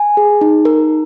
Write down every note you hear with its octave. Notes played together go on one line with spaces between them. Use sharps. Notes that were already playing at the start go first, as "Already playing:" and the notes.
Already playing: G#5
G#4
D#4
A#4